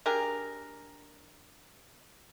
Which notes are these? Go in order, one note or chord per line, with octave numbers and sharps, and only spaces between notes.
D4 G4 G#4 A#4